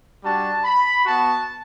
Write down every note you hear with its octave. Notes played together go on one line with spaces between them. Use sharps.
G3 D4 F#4 A5
B5
B3 F#4 A5